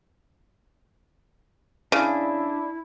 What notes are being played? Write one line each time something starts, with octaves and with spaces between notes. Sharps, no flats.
C#3 D4 E4